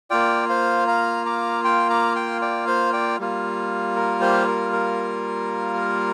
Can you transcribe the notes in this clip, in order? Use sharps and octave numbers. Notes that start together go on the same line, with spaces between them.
A#3 F4 D5 G5
C5 F5
F5 A#5
A#5 D6
G5 C6
A#5 D6
G5 C6
D5 G5
C5 F5
D5 G5
G3 A#3 F4
A#4
G4 C5
A#4
A#4